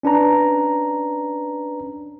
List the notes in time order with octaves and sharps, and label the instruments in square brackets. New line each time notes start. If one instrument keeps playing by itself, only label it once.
[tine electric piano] C#4 D4 B4 A#5